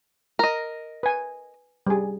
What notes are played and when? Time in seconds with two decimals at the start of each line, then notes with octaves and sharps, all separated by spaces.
0.39 A#4 D#5
1.03 B4 G#5
1.87 G3 G#4